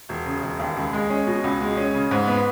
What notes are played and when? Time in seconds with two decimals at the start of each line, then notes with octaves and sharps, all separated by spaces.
0.09 E1
0.26 C#3
0.43 E1
0.59 D#2
0.76 C#2
0.93 G#3
1.10 C#4
1.27 B2
1.44 C#2
1.61 G#3
1.77 C#4
1.94 C#3
2.11 G#2
2.28 B3